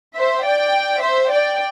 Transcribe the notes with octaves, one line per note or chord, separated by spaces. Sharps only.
C5 E5
D5 G5
C5 E5
D5 G5